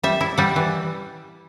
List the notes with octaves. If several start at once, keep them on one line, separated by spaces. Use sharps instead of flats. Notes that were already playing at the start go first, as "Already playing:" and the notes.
G3 E5
E4
G3 F#5
E3